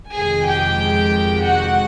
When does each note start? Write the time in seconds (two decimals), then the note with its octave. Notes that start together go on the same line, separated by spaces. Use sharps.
0.15 F2 C3 D#3 G#3 G#4 G#5
0.47 G4 G5
1.45 F#4 F#5